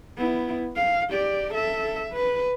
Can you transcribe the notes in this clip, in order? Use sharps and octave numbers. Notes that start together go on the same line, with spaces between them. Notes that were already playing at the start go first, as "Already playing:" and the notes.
B3 E4
F5
G4 D5
A4 E5
B4